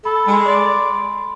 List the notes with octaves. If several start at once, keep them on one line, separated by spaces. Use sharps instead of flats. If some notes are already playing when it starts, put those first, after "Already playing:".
A4 B5
G#3 B5
C6
D5